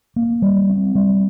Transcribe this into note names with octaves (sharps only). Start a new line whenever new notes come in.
A#3
G3
C4
G3